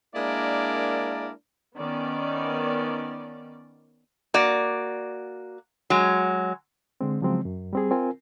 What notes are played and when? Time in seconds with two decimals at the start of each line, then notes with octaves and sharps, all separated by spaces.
0.15 G#3 A#3 D4 E4 A#4 D5
1.77 D#3 B3 C#4 D5
4.34 A#3 F#4 D5
5.90 F#3 G#3
7.01 D3 G#3 C4
7.21 C#3 F3 F#3 G#3 C4
7.45 F#2
7.73 G3 C4 G#4
7.91 C4 F4 A#4 G#5